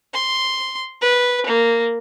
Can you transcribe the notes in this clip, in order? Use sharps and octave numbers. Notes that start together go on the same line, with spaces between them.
C6
B4
A#3